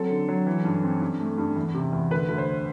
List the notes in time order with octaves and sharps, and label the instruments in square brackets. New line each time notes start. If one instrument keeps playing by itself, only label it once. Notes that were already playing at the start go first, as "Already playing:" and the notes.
Already playing: [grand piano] F#3 C4 A4
D3
F#3
E3
G2
C4
G2
A3
G2
E2
C3
E2
D2 B4
D2
C5